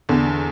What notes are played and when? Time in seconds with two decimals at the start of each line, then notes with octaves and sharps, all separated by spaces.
0.09 E2 D3